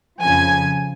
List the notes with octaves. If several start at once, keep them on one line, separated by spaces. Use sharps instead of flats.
F2 C#3 F3 G#5